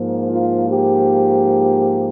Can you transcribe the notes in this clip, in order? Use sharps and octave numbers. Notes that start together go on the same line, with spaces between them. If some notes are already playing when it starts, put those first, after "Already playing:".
Already playing: G#2 F3 A#3
F4
G4